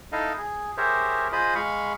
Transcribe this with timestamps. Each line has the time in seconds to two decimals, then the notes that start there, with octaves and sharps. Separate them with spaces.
0.12 D#4 E4 A4 D#5 F5
0.38 G#4
0.77 G4 G#4 A#4 C5 C#5 E5
1.32 F4 G#4 C5 D#5 B5
1.55 G#3 F5 B5 C#6